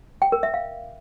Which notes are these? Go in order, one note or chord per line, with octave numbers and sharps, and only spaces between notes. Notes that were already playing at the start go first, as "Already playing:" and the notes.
G5
A#4
E5
F5